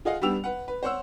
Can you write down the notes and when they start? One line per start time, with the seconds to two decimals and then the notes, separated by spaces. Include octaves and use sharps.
0.05 F4 G#4 D#5 F5 F#5
0.22 G3 B3 D4 G4 E6 F7
0.44 B4 F#5
0.68 B4
0.83 C5 C#5 F#5 E6